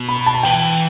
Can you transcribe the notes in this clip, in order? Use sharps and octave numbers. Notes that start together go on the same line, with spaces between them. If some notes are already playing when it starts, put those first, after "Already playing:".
Already playing: B2
B5
A5
E3 G5